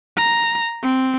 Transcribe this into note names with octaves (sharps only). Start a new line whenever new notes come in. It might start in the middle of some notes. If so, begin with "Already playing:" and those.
A#5
C4